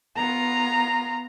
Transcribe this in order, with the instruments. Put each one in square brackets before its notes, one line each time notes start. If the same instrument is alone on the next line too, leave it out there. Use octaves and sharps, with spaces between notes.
[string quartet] B3 F4 [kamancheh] A#5